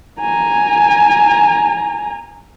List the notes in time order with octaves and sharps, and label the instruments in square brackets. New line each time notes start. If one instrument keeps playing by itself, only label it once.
[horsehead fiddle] G#5 A#5